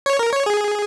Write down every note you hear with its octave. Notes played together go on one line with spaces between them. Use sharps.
C#5
A#4
C#5
G#4